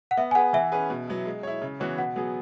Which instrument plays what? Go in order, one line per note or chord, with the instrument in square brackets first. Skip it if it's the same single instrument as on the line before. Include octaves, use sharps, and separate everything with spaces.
[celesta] F#5
[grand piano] B3 [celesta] E5
[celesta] G#5
[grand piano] G#4 B4 [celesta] F#5
[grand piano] E3 [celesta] E5
[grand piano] C#4 G#4 B4
B2
F#3 B3 E4
G#3
E4 C#5
C#3
E3 B3 F#4 C#5
[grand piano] B2 [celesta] F#5
[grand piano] F#3 B3 G#4